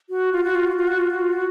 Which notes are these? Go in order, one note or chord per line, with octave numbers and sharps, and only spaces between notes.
F#4
F4
F#4
F4
F#4
F4
F#4
F4
F#4
F4
F#4